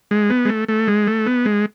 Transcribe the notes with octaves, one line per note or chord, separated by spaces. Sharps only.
G#3
B3
G#3
A3
A3
G#3
A3
B3
G#3